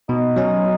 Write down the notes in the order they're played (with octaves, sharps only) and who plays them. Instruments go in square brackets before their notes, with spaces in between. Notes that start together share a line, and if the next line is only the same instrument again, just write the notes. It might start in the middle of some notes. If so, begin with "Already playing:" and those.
[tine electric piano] B2 [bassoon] D#4
[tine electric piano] F#3 C#4